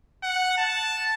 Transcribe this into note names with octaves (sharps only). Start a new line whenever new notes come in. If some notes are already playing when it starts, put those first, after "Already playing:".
F#5
A5